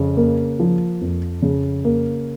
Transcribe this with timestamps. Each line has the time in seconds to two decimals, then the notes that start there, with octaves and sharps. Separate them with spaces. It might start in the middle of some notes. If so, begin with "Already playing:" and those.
Already playing: F2 C#3
0.17 A#3
0.60 F3
1.01 F2
1.42 C#3
1.85 A#3